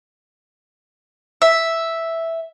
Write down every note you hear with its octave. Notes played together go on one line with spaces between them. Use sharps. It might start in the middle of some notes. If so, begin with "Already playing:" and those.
E5